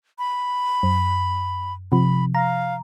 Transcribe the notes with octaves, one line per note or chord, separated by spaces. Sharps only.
B5
F#2
C3 F3 B5
F5 A#5